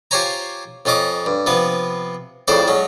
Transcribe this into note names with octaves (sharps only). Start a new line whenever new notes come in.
F4 G4 C5 C#5 G#5 A#5
F2 C#4 F4 D#5 D6
G2
C3 F3 B3 B4
F2 A2 C#3 A4 C5 D5
F#3 G#3 C#4